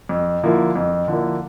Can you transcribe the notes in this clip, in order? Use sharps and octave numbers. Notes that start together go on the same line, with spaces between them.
F2
D3 F3 A#3 E4
F2
D3 F3 A#3 E4